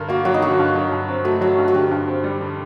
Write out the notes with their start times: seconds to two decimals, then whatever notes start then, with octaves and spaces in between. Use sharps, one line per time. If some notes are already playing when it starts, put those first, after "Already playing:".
Already playing: G2 D3 A#4
0.09 A#3 F#4
0.25 F#3 F#4
0.34 D#4
0.42 D3 F#4
0.59 G2
0.75 F#3
0.92 G2
1.08 C4
1.25 A3 F#4
1.41 F#3 F#4
1.58 G2
1.68 F#4
1.74 D3 G4
1.91 G2
2.08 C4
2.24 G3
2.41 D3